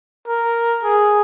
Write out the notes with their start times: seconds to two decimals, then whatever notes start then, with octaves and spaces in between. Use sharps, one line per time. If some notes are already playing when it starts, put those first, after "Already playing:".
0.28 A#4
0.83 G#4